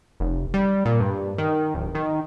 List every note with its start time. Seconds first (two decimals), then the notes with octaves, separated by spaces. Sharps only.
0.20 F1
0.54 G3
0.85 A#2
1.00 G2
1.38 D#3
1.75 D1
1.95 D#3